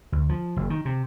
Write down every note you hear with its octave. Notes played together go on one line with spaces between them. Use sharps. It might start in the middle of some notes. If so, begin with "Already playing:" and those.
D2
F3
F#1
D#3
C3